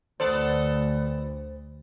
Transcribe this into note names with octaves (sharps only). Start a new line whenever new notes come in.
D2 B3 A4 C5 D5